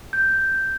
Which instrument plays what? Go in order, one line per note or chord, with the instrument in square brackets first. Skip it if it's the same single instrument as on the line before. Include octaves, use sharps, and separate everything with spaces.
[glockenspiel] G6